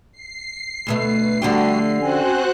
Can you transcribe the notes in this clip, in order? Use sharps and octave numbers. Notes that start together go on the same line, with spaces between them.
C7
D2 B2 A3 B4
D3 F3 G3 A3 D4 F#4 G4
C4 C#4 F#4 C5 G#5 F#6